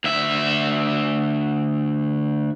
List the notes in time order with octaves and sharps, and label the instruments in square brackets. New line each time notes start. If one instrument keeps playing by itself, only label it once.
[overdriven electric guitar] D2 E5